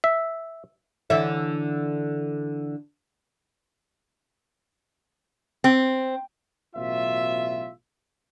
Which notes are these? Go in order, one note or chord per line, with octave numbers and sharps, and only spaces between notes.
E5
D3 E3 E5
C4
A1 B2 F#3 F4 E5